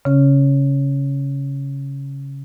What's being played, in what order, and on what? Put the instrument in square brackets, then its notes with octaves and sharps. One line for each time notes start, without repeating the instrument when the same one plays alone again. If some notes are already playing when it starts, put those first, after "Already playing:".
[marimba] C#3 C#4